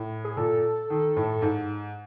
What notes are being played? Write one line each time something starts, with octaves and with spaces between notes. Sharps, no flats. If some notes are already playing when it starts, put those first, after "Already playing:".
Already playing: A2
G#4
A#2 A4
D#3
A2
G#2